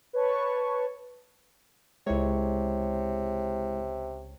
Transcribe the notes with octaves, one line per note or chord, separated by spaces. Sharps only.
B4 C#5 A5 C#6
C#2 C3 G#3 E4 C#5